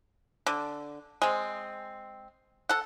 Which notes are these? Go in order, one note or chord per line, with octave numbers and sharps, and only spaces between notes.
D3
G#3 C4
A4 F#5